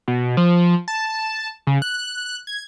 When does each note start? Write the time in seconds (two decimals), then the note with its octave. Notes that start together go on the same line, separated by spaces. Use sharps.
0.08 B2
0.37 F3
0.88 A5
1.67 C#3
1.82 F#6
2.47 G#6